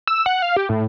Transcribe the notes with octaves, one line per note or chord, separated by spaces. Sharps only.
E6
F#5
F5
G4
A2